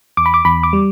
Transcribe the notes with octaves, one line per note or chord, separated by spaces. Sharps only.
E2 D6
B5
D6
E2 B5
D6
G3